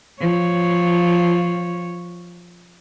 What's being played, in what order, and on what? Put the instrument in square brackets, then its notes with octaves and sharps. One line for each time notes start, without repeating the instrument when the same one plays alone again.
[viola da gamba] F3 C#5